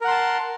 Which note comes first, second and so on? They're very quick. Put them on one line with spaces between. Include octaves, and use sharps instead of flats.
A#4 F#5 C6 A5